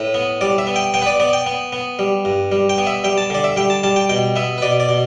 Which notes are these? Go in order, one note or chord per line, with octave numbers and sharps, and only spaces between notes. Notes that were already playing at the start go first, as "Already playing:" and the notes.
Already playing: A2 B4
B3
G3 D5
E5
B3
G5
B3 G5
B4
D5
B3 D5
G5
B3
B3
G3
G2
G3
G5
B3
E5
G3 G5
A5
D3 D5
E5
G3 G5
A5
G3 A5
G5
B2 G5
B3 E5
B4
B2 D5
D5
B2